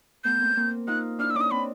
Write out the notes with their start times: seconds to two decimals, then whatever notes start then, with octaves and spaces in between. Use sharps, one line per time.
0.24 A3 B3 G6
0.40 A#3 C4
0.57 A#3 C4
0.87 D#4 F4 F#6
1.19 D4 E4 F6
1.30 E6
1.34 C#4 D#4 D6
1.41 D#6
1.51 C4 D4 B5